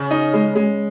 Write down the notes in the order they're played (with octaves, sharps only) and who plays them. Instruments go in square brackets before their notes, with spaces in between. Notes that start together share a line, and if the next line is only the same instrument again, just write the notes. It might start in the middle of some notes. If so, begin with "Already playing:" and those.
Already playing: [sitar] C#3
[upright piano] D#4
G#3
G#3